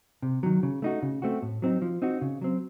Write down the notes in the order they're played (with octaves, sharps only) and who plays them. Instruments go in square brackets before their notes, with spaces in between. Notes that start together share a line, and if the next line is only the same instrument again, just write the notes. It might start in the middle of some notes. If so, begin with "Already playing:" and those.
[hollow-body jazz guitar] C3
D#3 F#3
C#3
A3 D#4 F#4
C#3
A3 C4 F#4
A2
F#3 C4 D#4
F3
C4 D#4 F#4
C#3
F#3 C4